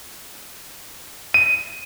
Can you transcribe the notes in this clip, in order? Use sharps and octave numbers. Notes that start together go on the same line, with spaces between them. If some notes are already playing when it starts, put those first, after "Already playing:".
D#7